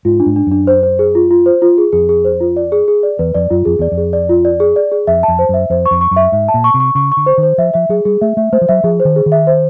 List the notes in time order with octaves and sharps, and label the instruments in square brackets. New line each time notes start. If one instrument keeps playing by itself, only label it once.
[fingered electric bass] G#2 [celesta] F4
[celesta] D4
[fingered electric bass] G#2
[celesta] D4
[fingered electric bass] F#2 [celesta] D4
[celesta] C5
C5
G#4
F4
F4
C5
F4
G#4
[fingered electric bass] F2 [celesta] G#4
[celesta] G#4
C5
F4
D5
G#4
G#4
D5
[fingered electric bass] E2 [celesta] B4
[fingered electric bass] F2 [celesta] D5
[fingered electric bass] F#2 [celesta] F4
[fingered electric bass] F2 [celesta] G#4
[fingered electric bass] E2 [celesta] D5
[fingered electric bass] F2
[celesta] G#4
D5
F4
D5
G#4
D5
G#4
[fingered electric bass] F2 [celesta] E5
[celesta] A5
[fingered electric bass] F2
[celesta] C5
[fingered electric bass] F#2 [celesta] E5
[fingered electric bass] F2 [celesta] C5
[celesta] C#6
[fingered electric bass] F2
[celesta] C#6
[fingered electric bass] F#2
[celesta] E5
[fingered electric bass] G#2 [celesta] E5
[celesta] A5
[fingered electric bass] A#2
[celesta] C#6
[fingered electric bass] C3
[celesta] C#6
[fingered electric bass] C#3 [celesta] C#6
[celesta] C#6
[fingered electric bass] D3
[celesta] C5
[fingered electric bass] D#3
[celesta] C5
[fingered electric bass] F3 [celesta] E5
[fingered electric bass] F3 [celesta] E5
[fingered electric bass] F#3 [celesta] G#4
[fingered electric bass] G3 [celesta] G#4
[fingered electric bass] A3 [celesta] E5
[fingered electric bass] A3 [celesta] E5
[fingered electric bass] A3 [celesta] C5
[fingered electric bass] F3
[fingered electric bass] F#3 [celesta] E5
[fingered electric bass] F3 [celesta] G#4
[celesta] C5
[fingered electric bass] D#3
[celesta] G#4
[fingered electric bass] D#3
[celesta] E5
C5